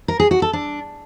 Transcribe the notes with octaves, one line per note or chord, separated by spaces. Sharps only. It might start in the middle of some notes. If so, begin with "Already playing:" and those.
A#4
G#4
F#4
A4
D4